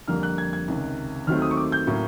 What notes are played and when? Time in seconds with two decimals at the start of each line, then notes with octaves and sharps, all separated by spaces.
0.08 F2 D3 G3 A#3 F6
0.23 F#6
0.38 G#6
0.53 G#6
0.68 C#2 C3 D#3
1.27 D#2 D#3 F#3 A3 C4 F6
1.42 D#6
1.51 C#6
1.57 D6
1.72 G6
1.87 A2 F#3 A#3 C#4